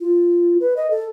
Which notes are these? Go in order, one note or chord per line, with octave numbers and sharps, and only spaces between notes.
F4
B4
D#5
A4